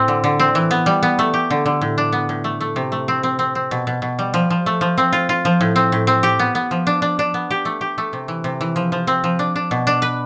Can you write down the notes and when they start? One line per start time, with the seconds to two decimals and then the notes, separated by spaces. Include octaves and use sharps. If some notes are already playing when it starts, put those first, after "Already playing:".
Already playing: A2 C4
0.08 D3
0.24 D3
0.40 C4
0.55 E3
0.71 B3
0.86 G3
1.03 B3
1.19 A3
1.34 G4
1.51 D3
1.66 D3
1.81 A2
1.98 D4
2.13 B3
2.29 A2
2.44 A3
2.61 A3
2.76 C3
2.92 A3
3.08 C4
3.23 C4
3.39 C4
3.55 C4
3.71 B2
3.87 B2
4.02 B2
4.19 G3
4.34 F3
4.50 F3
4.66 A3
4.81 F3
4.98 C4
5.13 F4
5.29 F4
5.45 F3
5.61 A2
5.76 C4
5.92 A2
6.07 C4
6.23 G4
6.39 B3
6.55 B3
6.71 F3
6.87 D4
7.02 D4
7.19 D4
7.34 B3
7.51 G4
7.65 A3
7.81 G4
7.98 A3
8.13 C3
8.28 E3
8.44 C3
8.61 E3
8.76 F3
8.92 F3
9.07 C4
9.24 F3
9.39 D4
9.56 D4
9.71 B2
9.87 D4
10.02 B4